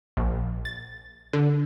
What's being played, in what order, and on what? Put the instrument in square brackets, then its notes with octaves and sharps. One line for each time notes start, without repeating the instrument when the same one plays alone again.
[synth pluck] A#1
A6
D3